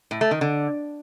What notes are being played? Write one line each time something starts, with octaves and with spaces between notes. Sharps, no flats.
A2
A3
D#3
D3